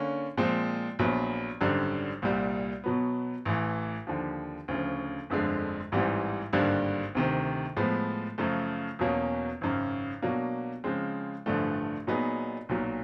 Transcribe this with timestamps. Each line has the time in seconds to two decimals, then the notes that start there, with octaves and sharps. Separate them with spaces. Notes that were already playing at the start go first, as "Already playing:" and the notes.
Already playing: D3 A#3 C#4
0.38 A#2 F3 G#3 C4
0.99 A#1 A#2 F#3 B3
1.61 G#1 F#2 D3 G3
2.22 C2 A#2 G3
2.84 B2 F#3 B3
3.45 A1 A2 E3
4.07 D#2 D3 F3
4.68 D2 C#3 F3
5.30 G1 F2 D3 F3 G#3
5.92 A1 G#2 E3 G3 C4
6.53 G#1 G2 D3 G3 A#3
7.15 D2 C3 D#3
7.77 A2 F3 G#3 B3
8.38 F#2 C#3 F3 A3
8.99 E2 B2 F#3 A#3 C#4
9.61 G#1 F#2 C#3
10.22 B2 F#3 A#3 D4
10.84 C#3 F3 G#3 C4
11.46 A1 G2 D3 F3 A3
12.07 A#2 F#3 B3 D#4 G#4
12.69 B1 A#2 F#3